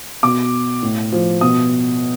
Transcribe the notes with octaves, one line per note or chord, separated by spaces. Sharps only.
B2 D6
A2
F3
B2 D#6